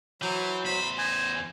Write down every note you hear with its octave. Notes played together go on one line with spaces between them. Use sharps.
E3 F#3 C5
E2 C5 B5
D#4 G#5